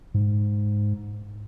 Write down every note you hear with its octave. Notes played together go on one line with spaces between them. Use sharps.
G#2